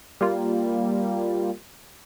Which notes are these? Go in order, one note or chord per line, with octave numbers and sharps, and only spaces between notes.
G3 A#3 F4